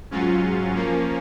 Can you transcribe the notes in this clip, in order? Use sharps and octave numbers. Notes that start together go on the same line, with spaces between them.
G#2 F#3 C#4 F4
F3 A#3 C#4